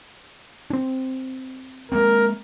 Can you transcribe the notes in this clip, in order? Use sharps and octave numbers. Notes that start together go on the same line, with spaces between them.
C4 D4
G#3 A#3 C4 A#4